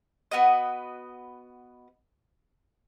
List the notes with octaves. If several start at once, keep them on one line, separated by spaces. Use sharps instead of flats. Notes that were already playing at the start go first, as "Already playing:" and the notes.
B3 F#4 B4 D#5